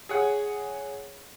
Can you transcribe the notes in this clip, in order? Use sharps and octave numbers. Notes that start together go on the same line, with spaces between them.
G#4 C#5 F#5